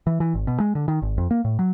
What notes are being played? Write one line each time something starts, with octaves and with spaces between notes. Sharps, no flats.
E3
E3
G#1
B2
G#3
D3
D#3
G#1
F2
A#3
A2
F#3